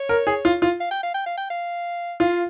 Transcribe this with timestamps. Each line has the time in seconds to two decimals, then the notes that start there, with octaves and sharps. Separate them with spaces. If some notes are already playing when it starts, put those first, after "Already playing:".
Already playing: C#5
0.09 A#4
0.27 G#4
0.45 F4
0.62 F4
0.80 F5
0.91 G5
1.03 F5
1.14 G5
1.26 F5
1.37 G5
1.50 F5
2.20 F4 F5